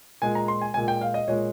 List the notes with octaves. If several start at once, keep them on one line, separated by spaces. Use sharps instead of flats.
A#2 G#3 G#5
A#5
C6
G#5
A#2 G#3 G#5
G5
F5
D#5
A#2 G#3 C#5